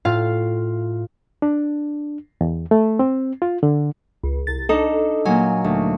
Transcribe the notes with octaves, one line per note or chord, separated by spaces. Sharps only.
A2 F4 F5
D4
E2
A3
C4
F4
D3
C#2
C2 A6
D4 D#4 A4
A#2 F#3 G#5
D2